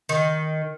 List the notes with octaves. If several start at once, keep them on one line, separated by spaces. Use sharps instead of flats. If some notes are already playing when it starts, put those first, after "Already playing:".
D#3